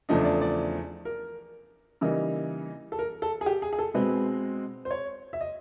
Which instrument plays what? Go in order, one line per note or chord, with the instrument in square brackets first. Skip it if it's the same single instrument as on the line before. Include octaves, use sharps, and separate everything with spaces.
[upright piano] E2 C#3 F3 A3 D4 D#5
D5
D5
A#4
C#3 E3 G3 A#3 D#4
A4
A#4
A4
G#4
G4
G#4
G#4
A4
B2 G#3 C4 B4
C5
C#5
E5
D#5